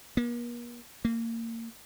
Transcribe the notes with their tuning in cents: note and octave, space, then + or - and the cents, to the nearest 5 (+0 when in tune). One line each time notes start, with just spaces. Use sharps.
A#3 +45
A#3 -25